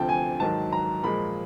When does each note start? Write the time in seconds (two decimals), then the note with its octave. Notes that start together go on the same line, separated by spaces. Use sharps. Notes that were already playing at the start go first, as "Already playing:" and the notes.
Already playing: D2 C3 F3 G5 A5
0.09 G#5
0.40 G#2 D#3 F#3 A5
0.73 A#5
1.03 A#2 F3 G#3 B5